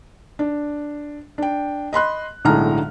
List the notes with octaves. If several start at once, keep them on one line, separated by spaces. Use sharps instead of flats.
D4
D4 G5
D#5 B5 C6 F#6
B1 A2 D3 G#3 A#5 F6